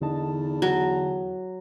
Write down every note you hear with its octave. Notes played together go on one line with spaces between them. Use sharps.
E2 D3 D#4 A5
F#3